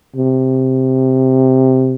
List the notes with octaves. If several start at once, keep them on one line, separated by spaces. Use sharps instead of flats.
C3